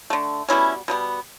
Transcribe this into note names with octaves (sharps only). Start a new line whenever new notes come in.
D3 A3
B2 G3 B3 C#4 E4
B2 G3 B3